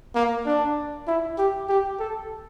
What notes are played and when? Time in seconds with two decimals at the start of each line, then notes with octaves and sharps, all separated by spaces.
0.15 A#3
0.46 D4
1.07 E4
1.38 G4
1.69 G4
2.00 A4